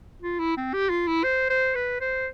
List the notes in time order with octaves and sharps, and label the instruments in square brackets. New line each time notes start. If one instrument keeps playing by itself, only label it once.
[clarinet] F4
E4
C4
G4
F4
E4
C5
C5
B4
C5